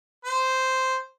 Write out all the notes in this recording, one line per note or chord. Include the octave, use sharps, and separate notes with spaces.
C5